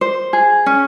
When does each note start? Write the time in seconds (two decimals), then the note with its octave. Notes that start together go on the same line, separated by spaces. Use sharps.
0.01 C5
0.33 G#4
0.66 C#4